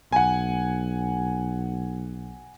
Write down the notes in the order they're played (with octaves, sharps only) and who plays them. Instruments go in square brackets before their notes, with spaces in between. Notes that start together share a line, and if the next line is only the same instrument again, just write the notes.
[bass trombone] B1 [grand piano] F#5 G#5